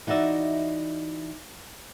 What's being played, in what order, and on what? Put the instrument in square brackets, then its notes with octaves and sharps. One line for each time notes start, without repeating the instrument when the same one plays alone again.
[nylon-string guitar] E3 D#4 F#4 D5 E5